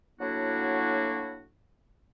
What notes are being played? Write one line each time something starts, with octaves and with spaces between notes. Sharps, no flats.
A2 F#3 A#3 D4 E4 F#4